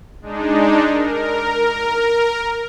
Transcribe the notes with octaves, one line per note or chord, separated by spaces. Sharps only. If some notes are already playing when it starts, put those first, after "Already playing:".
G#3 D4 D#4
A#4